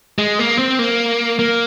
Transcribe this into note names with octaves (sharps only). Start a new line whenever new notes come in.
G#3
A#3
C4
A#3
A#3